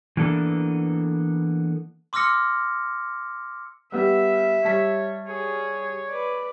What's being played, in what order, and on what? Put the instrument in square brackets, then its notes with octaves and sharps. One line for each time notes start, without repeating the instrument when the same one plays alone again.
[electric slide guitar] E3 A#3 B3 D4 A4
[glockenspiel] C6 D6 E6 F6 A#6 C#7
[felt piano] G3 B3 G4 [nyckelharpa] E5
[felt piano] G3 A5 B6 [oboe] C#5
[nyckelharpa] G#4 [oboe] C#5
[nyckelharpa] B4 D5